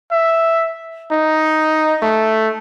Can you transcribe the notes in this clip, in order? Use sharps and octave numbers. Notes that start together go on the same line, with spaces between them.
E5
D#4
A3